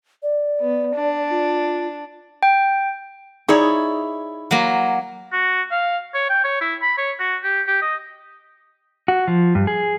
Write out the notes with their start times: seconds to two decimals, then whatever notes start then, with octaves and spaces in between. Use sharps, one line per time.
0.23 D5
0.60 B3
0.94 D4
1.30 F4
2.43 G5
3.48 D#4 E4 G#4 C#5 D5
4.51 F#3 A#3
5.32 F#4
5.71 F5
6.14 C#5
6.29 G5
6.44 C#5
6.61 E4
6.82 B5
6.98 C#5
7.20 F#4
7.43 G4
7.67 G4
7.82 D#5
9.08 F#4
9.28 F3
9.55 G2
9.67 G#4